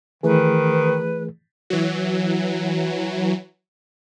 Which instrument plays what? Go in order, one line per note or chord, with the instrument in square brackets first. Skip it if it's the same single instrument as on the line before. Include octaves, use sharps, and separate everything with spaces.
[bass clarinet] D#3 [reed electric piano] E3 A3 G#4 [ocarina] B4
[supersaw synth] E3 F#3